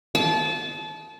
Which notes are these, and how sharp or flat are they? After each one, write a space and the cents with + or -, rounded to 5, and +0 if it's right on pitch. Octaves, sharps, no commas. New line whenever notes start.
A5 -30